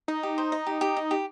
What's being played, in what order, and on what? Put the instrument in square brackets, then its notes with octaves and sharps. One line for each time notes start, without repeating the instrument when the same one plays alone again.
[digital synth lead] D#4 [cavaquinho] D#5
[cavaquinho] G4
C5
D#5
G4
G4
D#5
G4